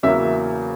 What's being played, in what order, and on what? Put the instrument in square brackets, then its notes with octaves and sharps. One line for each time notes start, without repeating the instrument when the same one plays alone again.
[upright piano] E2 C#3 F#3 A#3 E5